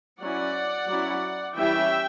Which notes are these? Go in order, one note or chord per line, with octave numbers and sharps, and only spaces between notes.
F#3 C#4 E4 D5 F#5
F#3 C#4 E4
E3 G3 C#4 E4 E5 G5